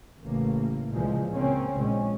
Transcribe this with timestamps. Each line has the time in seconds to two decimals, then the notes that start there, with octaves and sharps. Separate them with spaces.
0.23 A1 C#3 A#3
0.91 C#2 A#2 C#3 E3 F3 G#3
1.32 C#3 A#3 C4 C#4
1.76 A#1 G#3 C#4